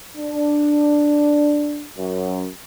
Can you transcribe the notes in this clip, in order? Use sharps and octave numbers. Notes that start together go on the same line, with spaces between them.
D4
F#2